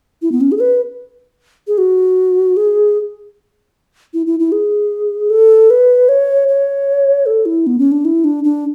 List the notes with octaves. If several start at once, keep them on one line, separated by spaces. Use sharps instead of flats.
E4
B3
C#4
G#4
A4
B4
G#4
F#4
G#4
E4
E4
E4
G#4
A4
B4
C#5
C#5
A4
E4
B3
C#4
D4
E4
D4
D4